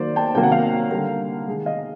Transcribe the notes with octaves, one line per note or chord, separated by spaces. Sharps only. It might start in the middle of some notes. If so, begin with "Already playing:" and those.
Already playing: D#3 F#3 A#3 C5 D5
G5 A5
C3 D#3 F#3 A#3 G5
F#5
F5 G5
D3 G3 A#3
D#3 G#3
D#5 F5